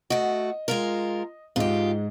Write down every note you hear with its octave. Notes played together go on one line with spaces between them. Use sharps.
A3 F#4 D#5
G#3 F4 A#4
G#2 G#3 F4 G4 D#5